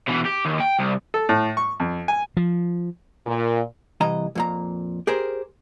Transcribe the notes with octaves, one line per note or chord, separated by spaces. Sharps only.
B2 E3
G4
D#2
G5
C2
A4
A2
C#6
F2
G#5
F3
A#2
C2 E3 D#5 A#5
F2 A#2 A#5
G4 G#4 A#4 C5